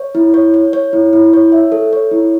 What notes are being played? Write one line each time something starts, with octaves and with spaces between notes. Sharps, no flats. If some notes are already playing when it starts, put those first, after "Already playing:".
Already playing: C#5
E4
C#5
C#5
C#5
E4
E4
C#5
E5
A4
C#5
E4